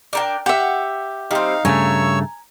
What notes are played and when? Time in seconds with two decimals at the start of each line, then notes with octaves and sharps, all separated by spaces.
0.13 D4 A#4 G5
0.46 G4 E5 F#5
1.31 G3 C4 D#4 F5
1.65 G2 C#3 A3 C#5 G#5 A#5 C#6 E6